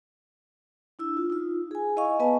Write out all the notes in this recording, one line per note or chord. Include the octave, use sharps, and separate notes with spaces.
D4 E4 E6
F4
D#4 F4
G#4 G#5
E4 D#5 F5 G#5 C#6
B3 B4 D#5 G#5 A5